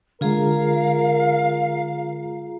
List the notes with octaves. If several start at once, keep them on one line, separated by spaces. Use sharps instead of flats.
D3 G#3 F4 G#4 A#4 F5 A#5